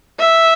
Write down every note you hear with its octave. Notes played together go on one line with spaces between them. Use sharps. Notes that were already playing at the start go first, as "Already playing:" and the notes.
E5